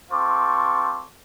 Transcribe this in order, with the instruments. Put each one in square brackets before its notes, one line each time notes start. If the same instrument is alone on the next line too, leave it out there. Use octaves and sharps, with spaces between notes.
[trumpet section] C4 F4 A4 C5 C#6 D6